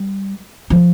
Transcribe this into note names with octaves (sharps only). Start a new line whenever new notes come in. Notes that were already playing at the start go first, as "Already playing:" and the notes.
Already playing: G3
F3